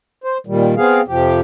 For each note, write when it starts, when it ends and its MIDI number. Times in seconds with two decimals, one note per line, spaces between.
0.24 0.38 72
0.47 0.74 46
0.47 0.74 51
0.47 0.74 55
0.77 1.01 59
0.77 1.01 60
0.77 1.01 68
0.77 1.01 77
1.08 1.41 41
1.08 1.41 48
1.08 1.41 53
1.08 1.41 67